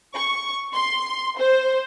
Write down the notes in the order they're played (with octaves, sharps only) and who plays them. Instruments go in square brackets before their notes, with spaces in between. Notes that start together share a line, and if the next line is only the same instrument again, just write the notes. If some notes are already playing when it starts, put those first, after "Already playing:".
[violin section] C#6
C6
C5